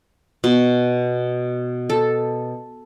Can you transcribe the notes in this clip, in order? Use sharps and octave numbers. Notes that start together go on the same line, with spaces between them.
B2
A4